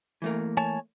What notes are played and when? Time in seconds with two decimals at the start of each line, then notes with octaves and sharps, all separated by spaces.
0.22 E3 A3 A#3
0.57 C#5 G#5 A5